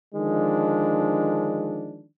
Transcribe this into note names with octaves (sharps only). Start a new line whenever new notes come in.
D3 D#3 F3 G#3 D4